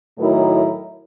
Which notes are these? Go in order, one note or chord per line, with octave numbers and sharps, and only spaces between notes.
A2 D#3 F#3 A3 E4 A#4